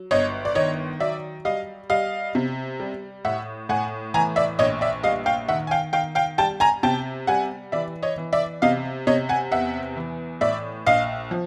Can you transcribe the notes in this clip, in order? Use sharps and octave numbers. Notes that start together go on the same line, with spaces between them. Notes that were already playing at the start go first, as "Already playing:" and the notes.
Already playing: F#3
G1 C#5 D#5
D5
D#3 C#5 D#5
F#3 D5 E5
G3 D#5 F5
G3 D#5 F5
C3
G3
A2 E5 F#5
A2 F#5 G#5
E3 G#5 A#5
D5 E5
A#1 C#5 D#5
D5 E5
G3 D#5 F5
F5 G5
D#3 E5 F#5
G#5
F5 G5
D#3 F5 G5
F5 G5
G3 G5 A5
G#5 A#5
C3 G5 A5
G3 F#5 G#5
E3 D5 E5
C#5 D#5
E3
D5 E5
C3 D#5 F5
C3 C#5 D#5
F#5 G#5
E2 E5 F#5
E3
A2 D5 E5
A#1 D#5 F5
F3